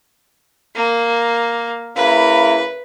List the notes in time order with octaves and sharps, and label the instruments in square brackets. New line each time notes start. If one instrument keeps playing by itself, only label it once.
[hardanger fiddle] A#3
[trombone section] C#3 A#3 E4 [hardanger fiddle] B4